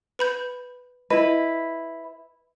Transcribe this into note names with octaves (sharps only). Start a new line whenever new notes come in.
B4 B5 G6
E4 B4 D#5